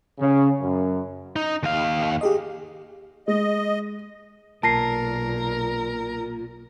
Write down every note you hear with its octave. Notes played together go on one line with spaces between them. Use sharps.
C#3
F#2
D#4
D#2 F5
G4 G#4 D#5
G#3 D#5
B1 A#2 A#4 A5 A#6 C7